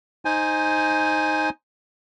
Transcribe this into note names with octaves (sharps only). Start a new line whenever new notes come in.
D#4 C5 G#5